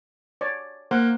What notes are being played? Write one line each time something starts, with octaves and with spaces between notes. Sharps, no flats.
C#5 D5
A#3 C5 F#5